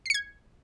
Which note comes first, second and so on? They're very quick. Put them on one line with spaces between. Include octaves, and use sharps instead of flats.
C7 C#7 G#6